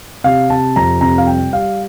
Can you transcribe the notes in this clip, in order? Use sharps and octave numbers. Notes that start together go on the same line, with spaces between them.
C3 F5
C3 A5
F2 A#5
C3 A#5
F5
G3 G5
G3 F5